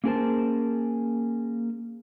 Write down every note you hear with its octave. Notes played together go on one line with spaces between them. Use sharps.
A#3 C#4 G#4 A#4 C5 A5